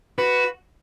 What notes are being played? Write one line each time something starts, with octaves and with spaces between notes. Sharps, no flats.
F#4 B4